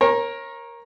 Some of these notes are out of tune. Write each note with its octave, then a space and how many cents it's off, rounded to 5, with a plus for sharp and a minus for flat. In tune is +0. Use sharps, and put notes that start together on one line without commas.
A#4 +10 C#5 -30